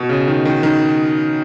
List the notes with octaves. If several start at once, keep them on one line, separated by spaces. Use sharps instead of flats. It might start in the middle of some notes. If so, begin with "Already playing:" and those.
Already playing: B2
C#3
D#3
D#3
D#3